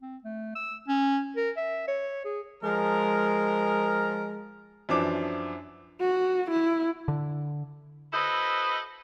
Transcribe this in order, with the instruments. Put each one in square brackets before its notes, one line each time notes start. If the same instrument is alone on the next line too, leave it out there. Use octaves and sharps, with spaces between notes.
[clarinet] C4
A3
E6
C#4
A#4
E5
C#5
G#4
[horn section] F3 G#3 A#4
[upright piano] F#2 E3 F3 D4 D6
[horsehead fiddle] F#4
E4
[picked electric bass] D3
[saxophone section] E4 F#4 A4 B4 C5 D#5